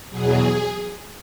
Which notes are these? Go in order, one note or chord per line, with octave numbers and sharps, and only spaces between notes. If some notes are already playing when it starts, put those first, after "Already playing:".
E2 B2 F#3 G#4